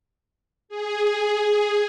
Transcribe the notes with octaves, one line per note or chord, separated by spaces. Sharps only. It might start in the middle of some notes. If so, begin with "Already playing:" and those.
G#4